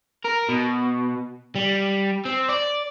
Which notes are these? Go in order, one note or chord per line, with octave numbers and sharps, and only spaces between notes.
A#4
B2
G3
C4
D5